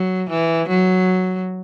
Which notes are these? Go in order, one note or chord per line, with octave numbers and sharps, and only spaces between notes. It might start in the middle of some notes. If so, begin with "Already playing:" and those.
Already playing: F#3
E3
F#3